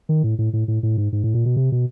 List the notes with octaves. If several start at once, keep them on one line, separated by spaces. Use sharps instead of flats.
D#3
A2
A2
A2
A2
A2
G#2
G#2
A2
A#2
B2
C3
B2